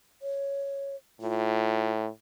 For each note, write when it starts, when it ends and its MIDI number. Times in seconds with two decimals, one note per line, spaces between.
0.22 0.96 73
1.21 2.09 45
1.21 1.92 65